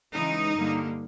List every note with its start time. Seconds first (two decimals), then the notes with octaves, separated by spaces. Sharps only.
0.13 C#3 E3 G#3 D#4
0.55 G2 D3 G3 A#3